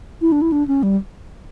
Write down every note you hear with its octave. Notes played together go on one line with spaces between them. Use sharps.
E4
D4
E4
D4
C#4
G3